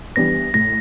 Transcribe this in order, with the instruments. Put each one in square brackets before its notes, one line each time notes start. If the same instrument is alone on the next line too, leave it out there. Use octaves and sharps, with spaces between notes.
[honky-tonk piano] E3 G3 B3 D4 [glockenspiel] A#6
[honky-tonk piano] A2 [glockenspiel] A#6